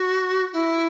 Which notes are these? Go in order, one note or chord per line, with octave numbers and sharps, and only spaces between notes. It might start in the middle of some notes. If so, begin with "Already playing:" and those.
Already playing: F#4
E4